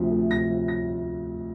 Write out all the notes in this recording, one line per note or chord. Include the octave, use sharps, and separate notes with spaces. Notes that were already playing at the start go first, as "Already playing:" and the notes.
Already playing: D2 C3 F3
A3
C3 A#6
F3
A#6